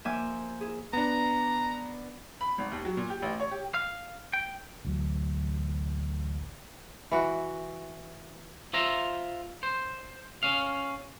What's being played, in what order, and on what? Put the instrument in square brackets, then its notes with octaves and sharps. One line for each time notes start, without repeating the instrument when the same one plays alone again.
[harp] F3 A#3 E5 G#5 D6 G6
E4 G#4
[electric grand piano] B3 D4 [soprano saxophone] A#5
[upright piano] B5
G#1
D#2
F#3
A#2
G4
A1
C#5
G4
[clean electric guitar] F5
G5
[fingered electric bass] A1 D2 F#3
[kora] E3 F#4
[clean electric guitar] F4 C5 E5 A#5
C5
C#4 F5